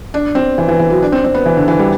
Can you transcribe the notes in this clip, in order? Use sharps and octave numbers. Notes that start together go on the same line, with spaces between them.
D4
C4
E3
E3
E3
F#3
D4
C4
C4
B3
E3
D3
E3
G3